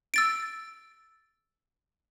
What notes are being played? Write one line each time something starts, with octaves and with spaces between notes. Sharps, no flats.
E6 A6 D7